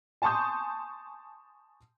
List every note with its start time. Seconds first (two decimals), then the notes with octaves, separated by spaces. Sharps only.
0.22 G#5 A5 C6 C#6 D#6 G6